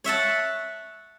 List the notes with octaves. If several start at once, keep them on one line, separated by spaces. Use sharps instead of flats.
C#5 E5 F#5 A5